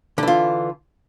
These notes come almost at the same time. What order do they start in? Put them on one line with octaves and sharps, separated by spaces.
D3 E3 F4